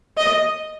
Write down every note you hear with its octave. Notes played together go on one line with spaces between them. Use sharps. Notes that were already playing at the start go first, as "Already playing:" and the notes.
D#5